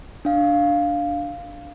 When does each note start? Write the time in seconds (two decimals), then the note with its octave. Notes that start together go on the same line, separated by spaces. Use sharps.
0.25 D4 F5